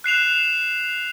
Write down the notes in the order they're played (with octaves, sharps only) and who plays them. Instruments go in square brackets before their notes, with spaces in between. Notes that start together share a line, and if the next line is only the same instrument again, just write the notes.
[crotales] F#6 C7 E7 F7